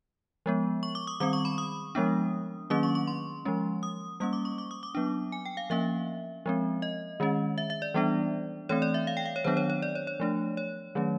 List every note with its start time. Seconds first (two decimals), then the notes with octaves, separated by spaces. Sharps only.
0.46 F3 G#3 B3
0.83 C#6
0.95 D6
1.07 D#6
1.20 D#3 G3 C4 D6
1.33 C#6
1.45 B5
1.58 D#6
1.95 F3 G#3 B3 D4
2.70 D#3 F#3 A#3 C#4 D6
2.83 C#6
2.95 C#6
3.07 C6
3.45 F3 G#3 C#4
3.83 D#6
4.20 G3 A#3 C#4 D#6
4.33 D6
4.45 C#6
4.58 D6
4.71 D#6
4.83 D6
4.95 F#3 B3 D4
5.32 G#5
5.45 G5
5.57 F5
5.70 F3 A#3 C#4 E5
6.46 F3 G#3 C4
6.82 D#5
7.20 D#3 G#3 C#4
7.58 E5
7.70 E5
7.82 D5
7.94 E3 G3 B3 D4
8.69 E3 A3 C4 C#5
8.82 D5
8.94 E5
9.07 F5
9.17 G5
9.26 F5
9.36 C#5
9.44 D#3 F#3 B3 D4 C5
9.57 C#5
9.70 C#5
9.82 D5
9.95 C#5
10.07 C#5
10.20 F3 A3 D4
10.57 C#5
10.95 D#3 F#3 A3 C#4